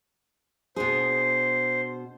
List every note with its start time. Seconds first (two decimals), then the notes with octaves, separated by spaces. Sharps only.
0.76 B2 D4 G#4 C5